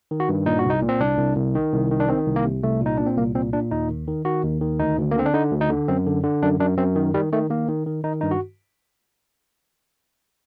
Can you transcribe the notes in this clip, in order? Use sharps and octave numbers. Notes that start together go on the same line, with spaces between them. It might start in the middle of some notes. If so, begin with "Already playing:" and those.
D#3
F#4
G2
A#2 D#4
F#4
C2
D#4
A#2
C4
C2 D4
C2
C2
D#3
C2
D#3
D4
D#3 C4
C2
A#3
C3
C2 A3
A#2 D#4
A#2 D4
C4
C2 A#3
A#2 C4
A#2 D4
D#2 D#4
D#3
D#3
D#3 F#4
D#2
D#3
D2 D#4
D2
A#3
D3 C4
D4
D3 D#4
D2
D#4
D3
F#2 C4
D3
D3
F#2 D4
F#2 D4
F#2 C4
D#3
D#3 G3
D#3 A3
D#3 A#3
D#3
D#3
D#3 D#4
G2 D#4
F#4